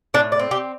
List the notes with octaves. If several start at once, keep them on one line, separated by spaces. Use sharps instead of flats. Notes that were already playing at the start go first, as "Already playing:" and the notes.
A2 D4
D5
C4
G4